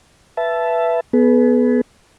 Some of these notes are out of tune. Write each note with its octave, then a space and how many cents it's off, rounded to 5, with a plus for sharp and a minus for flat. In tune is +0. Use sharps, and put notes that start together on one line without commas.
B4 +0 E5 +15 A5 -10
B3 +0 G#4 +45 B4 +5